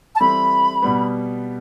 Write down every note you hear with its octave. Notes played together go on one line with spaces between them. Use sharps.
A5
E3 G3 C4 E4 A4 B5
B2 G3 B3